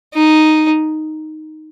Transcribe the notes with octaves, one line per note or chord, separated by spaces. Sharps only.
D#4